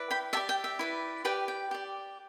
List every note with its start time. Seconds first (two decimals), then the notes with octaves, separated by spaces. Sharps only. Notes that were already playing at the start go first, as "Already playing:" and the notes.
Already playing: E4 B4 D5
0.11 G5 B5
0.33 G4 D5 E5 A5
0.49 G5
0.64 E5
0.79 E4 B4 D5
1.25 G4 B4 D5 G5
1.48 G5
1.71 G4 D5